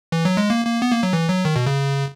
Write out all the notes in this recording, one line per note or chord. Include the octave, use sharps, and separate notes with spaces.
E3
F#3
G#3
A#3
A#3
B3
A#3
F#3
E3
F#3
D#3
B2
C#3